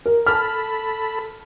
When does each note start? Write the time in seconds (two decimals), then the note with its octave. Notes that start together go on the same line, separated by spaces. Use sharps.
0.06 A#4
0.26 A4 A5 B5 F6